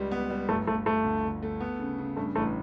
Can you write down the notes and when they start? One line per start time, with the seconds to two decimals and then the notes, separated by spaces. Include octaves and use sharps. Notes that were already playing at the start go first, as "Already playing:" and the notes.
Already playing: C#2 G3
0.11 B3
0.30 G3
0.49 G1 A3
0.67 G1 A3
0.86 G1 A3
1.04 D2
1.24 D3
1.43 A3
1.61 B3
1.79 C#3
1.98 C#3
2.16 G2 A3
2.35 A1 A3